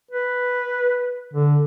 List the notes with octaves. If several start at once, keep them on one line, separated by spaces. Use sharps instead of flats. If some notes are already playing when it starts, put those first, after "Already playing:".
B4
D3